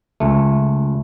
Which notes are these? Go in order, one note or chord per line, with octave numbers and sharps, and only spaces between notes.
C#2 A3